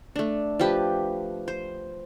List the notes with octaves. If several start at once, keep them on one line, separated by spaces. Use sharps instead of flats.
A3 D4
F3 G4 B4
C5